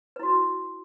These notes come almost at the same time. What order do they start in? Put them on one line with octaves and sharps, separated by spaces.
B4 E4 F#4